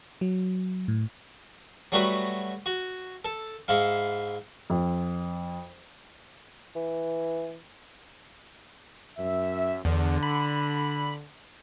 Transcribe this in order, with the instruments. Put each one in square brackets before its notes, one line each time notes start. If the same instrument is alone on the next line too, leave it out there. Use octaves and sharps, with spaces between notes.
[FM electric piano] F#3
A2
[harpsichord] F#3 G3 A3 F#4 B4
F#4
A4
G#2 E4 F5
[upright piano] F2
[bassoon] E3
[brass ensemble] F#2 E5
[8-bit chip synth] E2 [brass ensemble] D3
[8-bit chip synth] B5